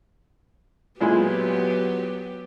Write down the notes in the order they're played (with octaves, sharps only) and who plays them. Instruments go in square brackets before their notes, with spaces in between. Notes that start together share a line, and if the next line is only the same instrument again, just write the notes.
[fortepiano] A#2 G#3 E4 [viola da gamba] F#3 B3 G4